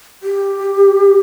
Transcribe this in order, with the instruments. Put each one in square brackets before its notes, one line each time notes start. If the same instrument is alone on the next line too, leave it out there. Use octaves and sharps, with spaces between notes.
[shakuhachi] G4